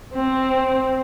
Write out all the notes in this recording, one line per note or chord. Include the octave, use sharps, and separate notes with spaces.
C4